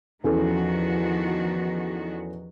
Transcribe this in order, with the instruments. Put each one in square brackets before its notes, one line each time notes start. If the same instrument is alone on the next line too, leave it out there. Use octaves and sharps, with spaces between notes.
[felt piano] E2 C#4 A4 [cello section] D#3 F3 F#4